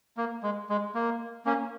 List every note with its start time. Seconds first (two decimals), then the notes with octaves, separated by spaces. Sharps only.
0.17 A#3
0.43 G#3
0.69 G#3
0.94 A#3
1.45 A#3 C#4